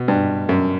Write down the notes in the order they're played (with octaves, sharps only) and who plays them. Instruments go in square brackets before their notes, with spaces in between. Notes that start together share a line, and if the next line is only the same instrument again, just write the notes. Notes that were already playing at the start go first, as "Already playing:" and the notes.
Already playing: [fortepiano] B2
G2
F#2